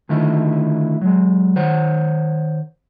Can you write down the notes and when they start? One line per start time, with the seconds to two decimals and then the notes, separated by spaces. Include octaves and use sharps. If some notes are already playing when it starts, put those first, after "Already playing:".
0.09 D3 D#3 A3 E4 F4
1.01 F#3 G#3
1.56 D#3 C5 C#5 F#5